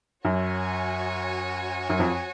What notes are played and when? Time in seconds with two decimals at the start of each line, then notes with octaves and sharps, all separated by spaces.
0.25 F#2 F#4 C#5 G#5
1.90 F#2
1.99 F2